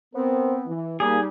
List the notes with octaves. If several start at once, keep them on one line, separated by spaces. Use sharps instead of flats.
B3 C4 A#4 C5
E3
G3 A#3 D#4 G4 G#4